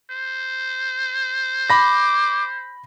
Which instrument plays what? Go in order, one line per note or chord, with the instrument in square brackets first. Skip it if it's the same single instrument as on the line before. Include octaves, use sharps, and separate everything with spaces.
[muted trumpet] C5
[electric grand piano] B5 A#6 [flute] D6